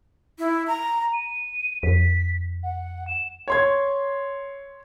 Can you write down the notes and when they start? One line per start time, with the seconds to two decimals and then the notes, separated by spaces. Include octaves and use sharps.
0.39 E4
0.67 A#5
1.13 D#7
1.83 F2 B6
2.63 F#5
3.07 E7
3.48 C#5 C6 G#6